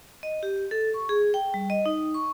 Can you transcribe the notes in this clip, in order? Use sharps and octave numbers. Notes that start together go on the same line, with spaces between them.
D#5
G4
A4
C#6
G#4
G5
G3
D#5
D#4
C#6